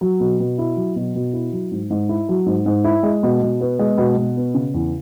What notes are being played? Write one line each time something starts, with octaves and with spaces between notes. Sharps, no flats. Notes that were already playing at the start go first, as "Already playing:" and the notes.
F#3
B2
B2
E4
F#3
B2
B2
E4
F#3
G#2
G#2
E4
F#3
G#2
G#2
E4
G#3
B2
B2
B3
G#3
B2
B2
B3
C#3
E2